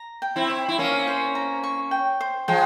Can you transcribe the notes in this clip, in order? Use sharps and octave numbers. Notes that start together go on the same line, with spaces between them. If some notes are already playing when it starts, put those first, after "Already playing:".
Already playing: A#5
G5
C4 E4
C#5
E4
A#3 C#4 E5
C5
A#5
C#6
G5
C5
F3 G#3 G5